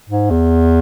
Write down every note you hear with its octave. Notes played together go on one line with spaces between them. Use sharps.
G#2
E2